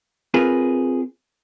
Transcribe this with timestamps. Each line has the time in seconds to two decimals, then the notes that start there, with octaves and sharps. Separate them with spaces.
0.34 C4 F4 G#4 A#4 B4